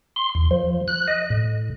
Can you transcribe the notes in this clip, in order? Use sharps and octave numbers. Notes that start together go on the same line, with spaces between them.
C6
E2
F3
F#6
D#5
A2